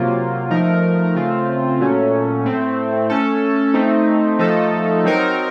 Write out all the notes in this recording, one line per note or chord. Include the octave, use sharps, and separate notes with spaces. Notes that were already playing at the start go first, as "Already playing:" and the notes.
Already playing: C3 F#3 A#3 F4
F3 A3 D#4 A#4
C#3 A3 C4 F4
A#2 F#3 A3 C#4
A2 A3 C4
A3 C#4 A4
A3 C4 D#4
F3 A3 D#4 A4
F#3 C4 D#4 A#4